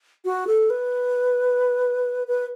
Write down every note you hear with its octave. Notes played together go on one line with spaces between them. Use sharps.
F#4
A4
B4
B4